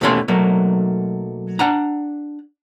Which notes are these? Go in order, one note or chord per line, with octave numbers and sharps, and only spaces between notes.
D#2 B2 E3 A3 C#4 C6
B1 F#3 A3 A#3
D4 F#5 A#5